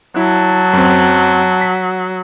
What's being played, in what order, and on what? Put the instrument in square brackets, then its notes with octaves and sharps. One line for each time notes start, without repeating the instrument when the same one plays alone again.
[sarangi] F#3 [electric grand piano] E4 [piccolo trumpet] A5
[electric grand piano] F#2 C4
B6